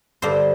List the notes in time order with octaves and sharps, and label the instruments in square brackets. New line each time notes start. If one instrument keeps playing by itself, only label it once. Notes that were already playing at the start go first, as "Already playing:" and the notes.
[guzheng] G2 D3 C5